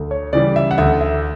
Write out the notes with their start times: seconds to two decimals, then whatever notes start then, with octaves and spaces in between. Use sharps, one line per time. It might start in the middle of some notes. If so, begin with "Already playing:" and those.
Already playing: D2
0.11 C#5
0.33 C#3 E3 G3 D5
0.56 E5
0.71 F#5
0.78 D2 E5
1.01 E5